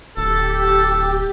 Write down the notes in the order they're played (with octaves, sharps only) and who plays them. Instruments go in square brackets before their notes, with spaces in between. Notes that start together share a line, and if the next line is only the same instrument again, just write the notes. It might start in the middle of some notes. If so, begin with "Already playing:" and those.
[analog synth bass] D1 [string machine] G4 [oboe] A4